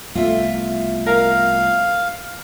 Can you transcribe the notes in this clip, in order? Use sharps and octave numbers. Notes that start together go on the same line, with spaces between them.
C2 A3 B3 F4 E5
A#4 F5